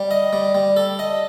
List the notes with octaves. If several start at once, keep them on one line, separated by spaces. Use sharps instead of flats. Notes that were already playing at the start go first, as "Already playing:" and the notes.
Already playing: G3
D#5
G3
G3
A4
D#5